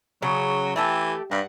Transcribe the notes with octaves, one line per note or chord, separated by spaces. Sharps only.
C#3 F#3
E3 A3 G4 A4
G2 F#5